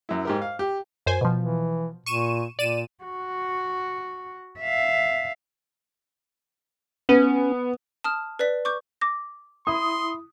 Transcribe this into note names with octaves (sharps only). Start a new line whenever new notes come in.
F#2 E4
G#2 G4 A#4
F5
G4
F#2 C5 G#5
B2 F3
E3
A#2 C#6 D#7 E7
A#2 D5 D#7 E7
F#4
E5 F5
B3 C#4
A5 D#6 F6
B4 D5 B6
C#6 D6 G6
D6 A#6
E4 C6 D#6